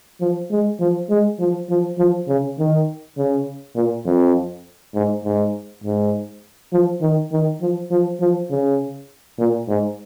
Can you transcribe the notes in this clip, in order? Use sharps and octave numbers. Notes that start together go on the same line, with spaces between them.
F3
G#3
F3
G#3
F3
F3
F3
C#3
D#3
C#3
A#2
F2
G#2
G#2
G#2
F3
D#3
D#3
F3
F3
F3
C#3
A#2
G#2